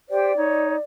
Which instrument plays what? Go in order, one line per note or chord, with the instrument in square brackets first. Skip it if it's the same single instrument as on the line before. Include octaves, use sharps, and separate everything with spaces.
[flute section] G4 C5 G5 [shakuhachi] D5
[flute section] D#4 C#5